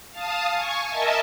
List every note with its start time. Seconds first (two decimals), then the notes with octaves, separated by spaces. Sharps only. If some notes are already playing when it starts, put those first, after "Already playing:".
0.10 F5 A5 D#6
0.52 G#5 C#6
0.88 A#4 D#5 E5 A5